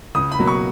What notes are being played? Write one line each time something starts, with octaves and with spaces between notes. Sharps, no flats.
C#2 D#6
B5
B2 F#3 A#3
C#6